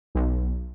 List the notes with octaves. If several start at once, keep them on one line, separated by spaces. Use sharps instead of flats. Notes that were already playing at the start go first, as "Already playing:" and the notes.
B1